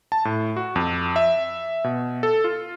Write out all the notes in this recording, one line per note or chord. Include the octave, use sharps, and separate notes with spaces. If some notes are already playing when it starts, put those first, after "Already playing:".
A5
A2
F#4
F2
E5
B2
A4
F4